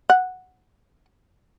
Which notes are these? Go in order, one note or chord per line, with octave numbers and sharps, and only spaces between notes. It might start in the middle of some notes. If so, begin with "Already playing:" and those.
F#5